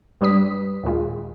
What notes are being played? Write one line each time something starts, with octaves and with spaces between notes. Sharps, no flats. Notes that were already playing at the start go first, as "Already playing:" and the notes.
G2 G3 D4 B4 D#6 B6
D#2 A#2 G#3 F4